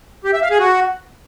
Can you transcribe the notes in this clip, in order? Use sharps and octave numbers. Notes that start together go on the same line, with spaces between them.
G4
E5
F5
G#4
F#4